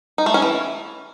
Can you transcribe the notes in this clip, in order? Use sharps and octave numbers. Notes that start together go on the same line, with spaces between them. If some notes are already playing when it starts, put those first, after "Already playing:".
D#4
A3
C#4
E3